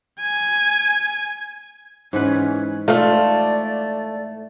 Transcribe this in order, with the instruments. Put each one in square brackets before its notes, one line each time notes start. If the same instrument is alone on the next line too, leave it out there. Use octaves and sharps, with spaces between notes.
[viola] G#5
[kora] G#2 E3 B4 [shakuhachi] C#4
[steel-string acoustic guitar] A3 [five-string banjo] F4 C5 F5 [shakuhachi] D5